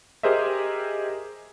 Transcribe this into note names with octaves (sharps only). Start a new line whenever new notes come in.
G4 G#4 A#4 C5 D#5 E5